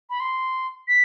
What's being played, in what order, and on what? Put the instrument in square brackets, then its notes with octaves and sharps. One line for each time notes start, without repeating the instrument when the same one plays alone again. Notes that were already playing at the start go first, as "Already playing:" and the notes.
[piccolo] B5
C6
B6